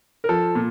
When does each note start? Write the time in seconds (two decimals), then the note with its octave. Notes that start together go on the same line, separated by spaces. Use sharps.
0.24 A#4
0.29 F3 A4
0.55 A#2